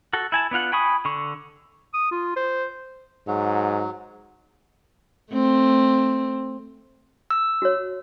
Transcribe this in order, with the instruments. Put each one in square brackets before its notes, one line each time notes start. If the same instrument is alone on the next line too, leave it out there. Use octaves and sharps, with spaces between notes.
[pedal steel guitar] F#4 A4
E4 G#5 A5
B3 D4 F4 F#5
G5 G#5 B5 C#6 D#6
D3 C#6
[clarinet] D#6
F4
C5
[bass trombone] G#2 [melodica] F#3
[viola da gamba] A3 C4
[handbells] E6
[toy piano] F#4 C#5